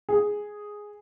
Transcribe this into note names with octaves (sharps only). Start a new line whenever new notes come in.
G#4